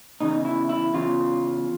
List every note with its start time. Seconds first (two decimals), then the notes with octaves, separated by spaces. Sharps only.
0.21 E2 C#3 D#4
0.45 E4
0.69 E4
0.94 E2 C#3 F4